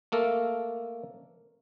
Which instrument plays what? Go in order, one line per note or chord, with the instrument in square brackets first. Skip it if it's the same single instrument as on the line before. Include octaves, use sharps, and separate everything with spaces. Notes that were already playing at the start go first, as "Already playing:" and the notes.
[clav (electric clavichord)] A3 A#3 A4 A#4